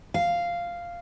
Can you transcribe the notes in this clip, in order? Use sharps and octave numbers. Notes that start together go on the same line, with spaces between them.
F5